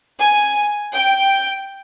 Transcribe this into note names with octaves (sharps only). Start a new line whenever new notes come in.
G#5
G5